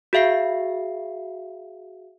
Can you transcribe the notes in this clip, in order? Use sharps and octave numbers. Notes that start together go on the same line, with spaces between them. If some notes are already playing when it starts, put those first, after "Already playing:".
F#4 G#4 E5 F5 C7